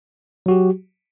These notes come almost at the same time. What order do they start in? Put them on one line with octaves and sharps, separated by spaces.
F#3 F#4 G4